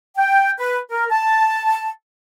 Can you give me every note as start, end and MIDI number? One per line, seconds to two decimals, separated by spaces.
0.17 0.52 79
0.59 0.78 71
0.91 1.06 70
1.11 1.89 81